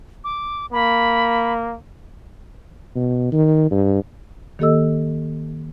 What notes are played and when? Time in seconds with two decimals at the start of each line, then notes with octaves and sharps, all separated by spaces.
0.24 D6
0.73 A#3 B5
2.95 B2
3.32 D#3
3.71 G2
4.59 D#3 A#3 G4 A4 D#5 E6